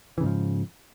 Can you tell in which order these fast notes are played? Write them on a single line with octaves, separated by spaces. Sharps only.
E3 C#3 G#2 F3